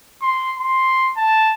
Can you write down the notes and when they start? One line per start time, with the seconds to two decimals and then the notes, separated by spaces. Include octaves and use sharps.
0.22 C6
0.59 C6
1.17 A5